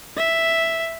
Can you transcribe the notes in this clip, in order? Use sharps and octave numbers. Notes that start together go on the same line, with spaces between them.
E5